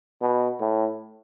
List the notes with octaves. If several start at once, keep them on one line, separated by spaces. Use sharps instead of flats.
B2
A2